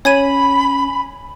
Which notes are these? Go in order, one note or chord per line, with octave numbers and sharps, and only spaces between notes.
C#4 C#5 G#5 B5 G#6 D#7